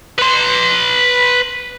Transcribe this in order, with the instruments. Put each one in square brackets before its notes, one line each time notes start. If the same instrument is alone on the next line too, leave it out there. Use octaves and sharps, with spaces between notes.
[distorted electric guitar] B4 C6